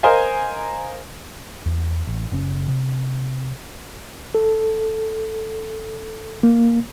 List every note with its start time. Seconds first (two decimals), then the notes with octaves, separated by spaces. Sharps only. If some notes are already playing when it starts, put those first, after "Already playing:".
0.03 A#4 C5 D#5 F5 G#5
1.66 E2
2.07 A1
2.32 F#1 C#3 C#4
2.68 C3
4.35 A4
6.43 A#3